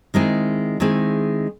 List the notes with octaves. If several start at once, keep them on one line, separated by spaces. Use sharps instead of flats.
D#3 G#3 C4 E4 G#4
D#3 G#3 C4 E4 G#4